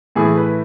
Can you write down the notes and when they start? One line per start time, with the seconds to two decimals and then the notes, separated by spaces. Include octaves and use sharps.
0.16 A2 E3 A3 G#4
0.37 B4